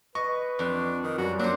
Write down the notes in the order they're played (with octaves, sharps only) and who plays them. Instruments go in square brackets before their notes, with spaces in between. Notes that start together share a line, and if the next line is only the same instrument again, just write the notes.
[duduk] B4 [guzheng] D#5 [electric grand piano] C#6
[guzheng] F2 [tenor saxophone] D4
[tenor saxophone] D#3
[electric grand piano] F#2 [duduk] G3 [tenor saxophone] F#4
[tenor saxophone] F#3 [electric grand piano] A#3 [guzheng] D4 C5